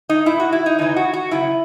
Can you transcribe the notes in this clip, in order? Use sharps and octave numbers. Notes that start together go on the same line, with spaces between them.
D#4
A#2 E4
F#4
E4
D#4
E2 C#3 E3 D#4
F#4
F#4
F#2 C#3 E4